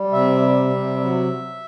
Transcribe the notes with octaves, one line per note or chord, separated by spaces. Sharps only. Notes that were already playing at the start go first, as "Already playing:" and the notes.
Already playing: G3
C3 E5
G3
C3
F#3